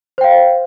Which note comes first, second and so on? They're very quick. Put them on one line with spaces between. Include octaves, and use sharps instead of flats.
C5 G5 F5